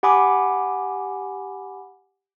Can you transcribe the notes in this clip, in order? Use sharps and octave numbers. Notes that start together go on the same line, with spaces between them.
G4 F#5 G#5 B5 D6 D#6